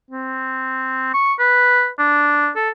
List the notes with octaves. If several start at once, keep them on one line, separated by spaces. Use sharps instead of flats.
C4
C#6
B4
D4
A4